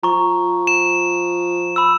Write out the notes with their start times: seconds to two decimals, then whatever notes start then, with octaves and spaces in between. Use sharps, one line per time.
0.03 F3 A#5 C#6
0.67 E7
1.76 B5 E6